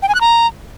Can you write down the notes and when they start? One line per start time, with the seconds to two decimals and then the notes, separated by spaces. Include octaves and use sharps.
0.02 G5
0.08 G#5
0.15 F#6
0.21 A#5